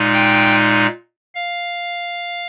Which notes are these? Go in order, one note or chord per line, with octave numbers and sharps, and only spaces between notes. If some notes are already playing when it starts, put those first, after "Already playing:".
Already playing: A#2 G#3 D#4
G5
F5